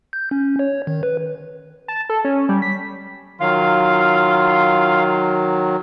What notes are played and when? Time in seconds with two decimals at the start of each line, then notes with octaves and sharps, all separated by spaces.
0.13 G6
0.31 C#4
0.59 C#5
0.87 D#3
1.03 B4
1.88 A5
2.09 A4
2.25 C#4
2.49 G3
2.62 B6
3.41 D#3 F#3 F4 F5